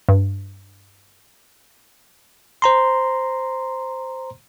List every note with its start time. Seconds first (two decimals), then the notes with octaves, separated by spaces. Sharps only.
0.09 G2
2.62 C5 A#5 C6